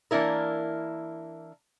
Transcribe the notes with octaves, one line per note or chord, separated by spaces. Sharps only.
E3 A#3 D4 E4 A#4